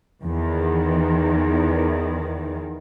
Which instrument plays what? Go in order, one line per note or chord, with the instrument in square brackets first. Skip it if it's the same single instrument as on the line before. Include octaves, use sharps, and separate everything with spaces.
[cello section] E2 D#3